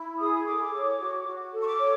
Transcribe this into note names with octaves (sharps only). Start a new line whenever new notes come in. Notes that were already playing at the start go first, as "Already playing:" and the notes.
Already playing: E4
G#4 D#6
A4 D6
C#5
F#4
F#4
A4
C#6
D6
C#5